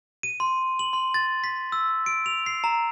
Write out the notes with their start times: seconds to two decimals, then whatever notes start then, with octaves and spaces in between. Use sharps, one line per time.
0.23 D#7
0.40 C6
0.79 F#7
0.93 C6
1.14 A6
1.44 B6
1.72 E6
2.06 D7
2.26 F7
2.46 C7
2.64 A#5